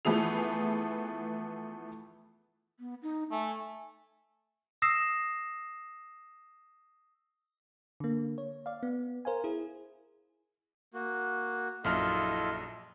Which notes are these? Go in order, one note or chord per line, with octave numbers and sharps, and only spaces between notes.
E3 F3 A3 B3 G#4 F7
B3
D#4
A3 G#5
D#6 E6 A#6 C7 E7
D3 A#3
C#5
D5 F5
B3
A#4 C5 F5 G#5
E4 G#4
A#3 F#4
A#1 F#2 E4 F4 A4 D#5 F6